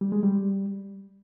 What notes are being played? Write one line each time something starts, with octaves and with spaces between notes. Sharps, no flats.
G3
G#3
G3